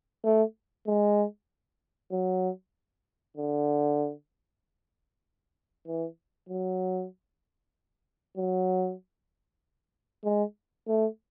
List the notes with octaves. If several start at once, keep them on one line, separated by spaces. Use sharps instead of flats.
A3
G#3
F#3
D3
E3
F#3
F#3
G#3
A3